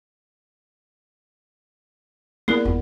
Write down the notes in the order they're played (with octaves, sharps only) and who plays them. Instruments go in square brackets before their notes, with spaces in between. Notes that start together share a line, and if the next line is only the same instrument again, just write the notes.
[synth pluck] A#3 B3 G#4 [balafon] E4 A#4 D5
[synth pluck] G1 F2 B3